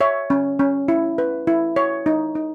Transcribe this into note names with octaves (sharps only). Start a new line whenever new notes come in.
C#5 E5
C#4
C#4
E4
B4
E4
C#5
D#4
D#4